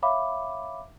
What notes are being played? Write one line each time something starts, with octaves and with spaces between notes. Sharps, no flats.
C#5 E5 F5 B5 D6